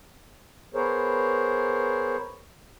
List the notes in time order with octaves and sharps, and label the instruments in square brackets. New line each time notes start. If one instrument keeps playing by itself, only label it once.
[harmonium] B3 G#4 A#4 C5 C#5